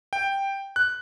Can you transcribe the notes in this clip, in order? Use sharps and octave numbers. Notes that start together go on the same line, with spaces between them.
G5
F#6